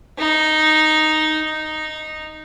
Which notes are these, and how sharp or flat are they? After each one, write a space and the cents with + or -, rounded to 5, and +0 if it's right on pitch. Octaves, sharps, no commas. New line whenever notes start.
D#4 +0
D#4 -5